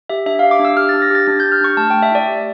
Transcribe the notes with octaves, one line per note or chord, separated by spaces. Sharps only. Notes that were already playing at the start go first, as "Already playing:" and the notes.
G4 E5
D4 E5
G4 F5
D6
D4
E6
G4 F6
D4 A6
A#6
G4 A6
D4 A6
G4 G6
F6
D4 C#6
A3 A5
A3 G5
E5
E4 D5
G4